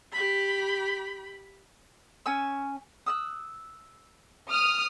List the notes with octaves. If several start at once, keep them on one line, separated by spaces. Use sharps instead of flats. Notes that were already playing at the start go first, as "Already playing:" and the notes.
G4 B5
C#4 G#5 E6
D#6 E6 F#6
D#6 F6